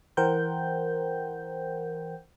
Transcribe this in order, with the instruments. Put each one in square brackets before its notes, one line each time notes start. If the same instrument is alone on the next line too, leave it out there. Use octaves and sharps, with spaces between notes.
[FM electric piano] E3 A#4 C5 F#5 G5 G6